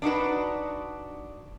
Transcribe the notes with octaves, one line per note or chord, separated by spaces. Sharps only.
D4 D#4 F#4 B4